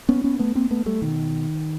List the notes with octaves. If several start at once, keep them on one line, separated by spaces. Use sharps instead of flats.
B3 C#4
B3 C#4
A3 B3
A#3 C4
A3 B3
G3 A3
B2 D#3